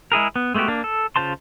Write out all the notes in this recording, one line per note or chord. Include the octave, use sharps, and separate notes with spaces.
G#3 E4 G#4 A#4
B3
G#3 A3 B3 F#4 G4
A#3 D4
A4
C#3 F4 C5 A5 C6